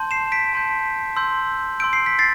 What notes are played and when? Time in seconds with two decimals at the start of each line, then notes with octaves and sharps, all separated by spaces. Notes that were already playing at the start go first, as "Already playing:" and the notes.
Already playing: A5 C6 G6
0.11 C7 E7
0.32 B6 D7
0.53 A5 C6 G6
1.16 C6 E6 G6
1.80 C6 E6 G6 D7
1.93 C7
2.06 B6
2.19 A6 C7